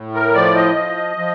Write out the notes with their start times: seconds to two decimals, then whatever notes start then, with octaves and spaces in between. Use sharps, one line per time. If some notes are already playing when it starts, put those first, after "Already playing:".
Already playing: A2
0.14 A#4
0.34 F3 D5
0.55 D#5
0.76 F3
1.16 F3